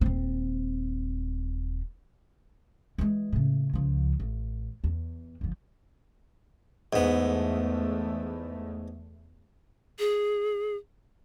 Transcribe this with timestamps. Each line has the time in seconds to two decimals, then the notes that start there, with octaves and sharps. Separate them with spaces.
0.01 D#1 C4
2.98 E3 G#3
3.32 A2 C#3
3.73 C#2 F3
4.20 A1
4.84 E2
5.41 G1 F3
6.93 E2 G#2 A3 B3
9.99 G#4